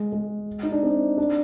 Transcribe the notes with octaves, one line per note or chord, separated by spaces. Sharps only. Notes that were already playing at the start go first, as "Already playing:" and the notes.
Already playing: G#3
G#3
D#4
D4
C4
D4